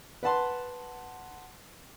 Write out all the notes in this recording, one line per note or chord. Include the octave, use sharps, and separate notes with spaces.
B4 F#5 A5 C6